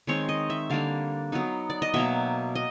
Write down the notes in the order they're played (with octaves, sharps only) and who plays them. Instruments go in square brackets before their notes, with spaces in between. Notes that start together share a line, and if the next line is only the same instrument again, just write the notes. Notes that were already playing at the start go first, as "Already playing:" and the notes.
[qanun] D#3 G#3 C4 C#5
D#5
E5
D3 G3 A#3 D4 F5
F#3 B3 D#4
D5
D#5
B2 F#3 A#3 E5
D#5